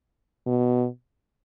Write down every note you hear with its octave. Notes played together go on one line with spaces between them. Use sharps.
B2